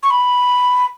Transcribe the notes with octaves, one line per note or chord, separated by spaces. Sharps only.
C#6
B5